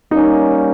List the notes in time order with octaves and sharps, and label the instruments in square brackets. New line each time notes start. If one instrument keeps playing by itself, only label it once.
[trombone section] G3 A#3 C#4 [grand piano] D#4